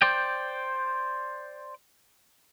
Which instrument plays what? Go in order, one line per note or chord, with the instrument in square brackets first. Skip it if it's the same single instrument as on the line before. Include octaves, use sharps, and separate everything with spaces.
[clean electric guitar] C5 D5 G5